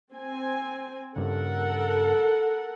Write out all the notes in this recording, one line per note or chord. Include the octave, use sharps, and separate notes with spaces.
C4 G#5
G2 C#3 A4 A#4 F#5